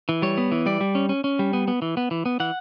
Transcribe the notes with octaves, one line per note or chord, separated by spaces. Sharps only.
E3
G3 C#5
B3
E3
G3 D5
G3
C#4
C#4
C#4
G3
B3
B3
E3
B3
E3
B3
E3 F#5